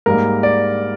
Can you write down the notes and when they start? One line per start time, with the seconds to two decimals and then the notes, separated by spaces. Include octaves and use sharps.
0.06 G#2 G3 A#3 A#4
0.43 D5